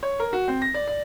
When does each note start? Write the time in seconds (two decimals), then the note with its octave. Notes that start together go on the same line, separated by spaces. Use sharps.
0.03 C#5
0.20 A#4
0.33 F#4
0.48 C4
0.62 A#6
0.74 D5
0.88 D5